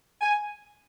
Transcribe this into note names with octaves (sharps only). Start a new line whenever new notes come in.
G#5